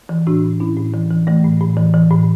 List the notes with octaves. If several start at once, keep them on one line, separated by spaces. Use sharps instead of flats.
E3
A2 D4 F#4
A2
A2 C#4 E4
A2
E3
E3
E3 A3
A2
A2
E3
E3
A2